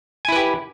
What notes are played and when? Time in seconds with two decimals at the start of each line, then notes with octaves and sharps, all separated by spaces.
0.25 G#5
0.29 E4
0.32 B4
0.36 G4